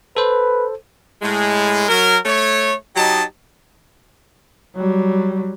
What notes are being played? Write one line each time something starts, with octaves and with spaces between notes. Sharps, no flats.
A4 B4 C5
A2 G#3
F#3 A#4
A3 C#5
F#3 D#4 G4 D#5 A5
F#3 G3